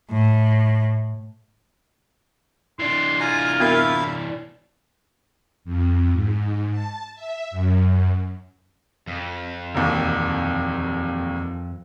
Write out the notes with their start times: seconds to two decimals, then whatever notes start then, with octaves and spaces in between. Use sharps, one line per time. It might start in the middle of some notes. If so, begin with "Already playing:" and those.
0.11 A2
2.79 E3 D4 C6
3.20 F4 G#5 A#5
3.60 B3 E4 F#4 A#4 E5 F5
5.64 F2
6.13 G#2
6.71 A5
7.14 E5
7.51 F#2
9.07 F2
9.75 E1 D#2